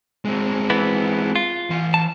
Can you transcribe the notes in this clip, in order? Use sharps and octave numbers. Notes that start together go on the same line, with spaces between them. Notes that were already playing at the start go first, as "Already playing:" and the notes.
G#3 C4
E3 B3 E4
F4
E3 C6
A5